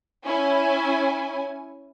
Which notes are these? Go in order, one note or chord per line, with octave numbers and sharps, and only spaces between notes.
C#4 E4 G#5